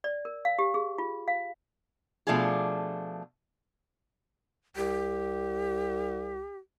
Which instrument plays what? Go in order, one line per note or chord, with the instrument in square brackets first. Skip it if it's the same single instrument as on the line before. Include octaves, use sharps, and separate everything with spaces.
[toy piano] D5
A#4
F5
G4
G#4
F4
F5
[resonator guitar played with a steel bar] B2 F3 A3 D4 F4 G#4
[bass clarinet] C2 [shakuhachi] G4